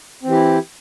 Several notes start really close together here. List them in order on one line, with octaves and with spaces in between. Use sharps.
C4 E3 G4 E4